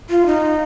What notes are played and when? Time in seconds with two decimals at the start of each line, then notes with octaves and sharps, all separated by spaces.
0.10 F4
0.26 D#4